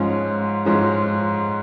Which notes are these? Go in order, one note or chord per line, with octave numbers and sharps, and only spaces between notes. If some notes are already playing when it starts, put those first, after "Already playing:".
Already playing: G#2 F3 G#3 C#4
G#2 F3 G#3 C#4